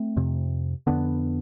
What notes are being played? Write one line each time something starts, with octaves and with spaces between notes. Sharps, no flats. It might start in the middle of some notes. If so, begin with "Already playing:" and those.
Already playing: A3 C4
F2 C3
F2 D3 B3 D4